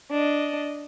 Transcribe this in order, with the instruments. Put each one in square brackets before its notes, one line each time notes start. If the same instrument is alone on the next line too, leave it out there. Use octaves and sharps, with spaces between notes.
[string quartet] D4 D#5